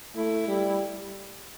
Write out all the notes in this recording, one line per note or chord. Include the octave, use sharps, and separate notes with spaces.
A3 E4
G3